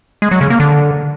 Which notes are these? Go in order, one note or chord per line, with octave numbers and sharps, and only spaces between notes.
G#3
F#3
C#3
A#3
D3